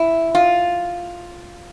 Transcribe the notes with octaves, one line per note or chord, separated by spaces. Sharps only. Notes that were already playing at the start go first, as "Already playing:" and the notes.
Already playing: E4
F4